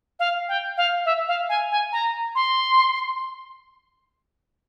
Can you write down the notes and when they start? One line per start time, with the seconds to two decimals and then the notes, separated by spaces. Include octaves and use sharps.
0.19 F5
0.48 G5
0.77 F5
1.06 E5
1.28 F5
1.49 G#5
1.71 G#5
1.92 A#5
2.35 C6